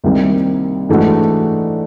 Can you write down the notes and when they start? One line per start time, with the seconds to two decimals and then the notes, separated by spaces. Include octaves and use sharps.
0.04 C2 C3 D#3 G3 A#3
0.89 G#2 E3 A3 D4 F#4